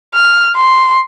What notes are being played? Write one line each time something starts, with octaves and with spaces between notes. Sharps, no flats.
F6
C6